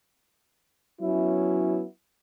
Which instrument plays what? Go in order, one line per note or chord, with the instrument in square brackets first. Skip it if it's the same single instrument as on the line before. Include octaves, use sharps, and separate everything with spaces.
[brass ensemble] F#3 B3 C#4 E4